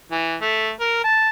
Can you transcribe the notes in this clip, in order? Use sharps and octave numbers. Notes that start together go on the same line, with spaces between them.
E3
A3
A#4
A5